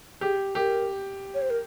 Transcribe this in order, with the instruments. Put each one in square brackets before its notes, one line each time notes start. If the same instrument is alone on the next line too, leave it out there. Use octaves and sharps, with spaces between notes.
[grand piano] G4 [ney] G#4
[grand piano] G4 [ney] A#4
[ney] C#5
C5
A#4